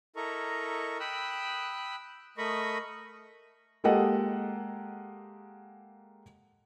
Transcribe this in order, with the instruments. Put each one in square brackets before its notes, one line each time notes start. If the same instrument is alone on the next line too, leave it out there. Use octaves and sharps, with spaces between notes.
[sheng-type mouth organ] E4 A4 A#4 D#5 A#5 C#6
G5 B5 D#6 E6 F#6
A3 A#4 D#5 B5 C#6 D#6
[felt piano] G#3 A#3 G4 A4 D#5 F#5